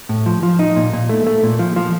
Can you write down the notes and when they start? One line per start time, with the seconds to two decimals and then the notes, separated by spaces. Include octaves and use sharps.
0.09 A2
0.26 F3
0.43 F3
0.59 D#4
0.76 A#2
0.93 A#2
1.09 A3
1.27 A3
1.43 A#2
1.59 F3
1.76 F3